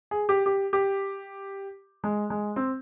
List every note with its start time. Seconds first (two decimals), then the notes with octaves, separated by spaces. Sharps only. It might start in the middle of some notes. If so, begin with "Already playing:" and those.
0.11 G#4
0.29 G4
0.46 G4
0.73 G4
2.04 G#3
2.30 G#3
2.56 C4